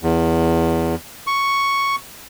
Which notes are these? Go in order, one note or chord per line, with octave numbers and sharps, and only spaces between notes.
E2
C#6